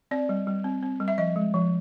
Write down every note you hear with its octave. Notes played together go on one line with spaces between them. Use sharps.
C4 D5
G3
G3
C4
C4
G3
E5
F3 D#5
G#3
F3